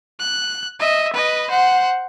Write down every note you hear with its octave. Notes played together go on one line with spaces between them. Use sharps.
F#6
D#5 E5
B4 D#5
C5 F#5